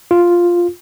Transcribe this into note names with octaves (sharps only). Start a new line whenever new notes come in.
F4